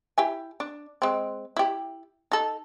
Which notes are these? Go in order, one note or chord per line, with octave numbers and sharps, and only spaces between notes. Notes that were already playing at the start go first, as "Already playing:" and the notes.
E4 G4 G#5
D4
G#3 C4
E4 G4
D#4 A4